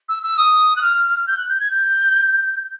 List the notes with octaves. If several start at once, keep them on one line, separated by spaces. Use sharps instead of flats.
E6
E6
D#6
F#6
F6
G6
F#6
G6
G#6
G6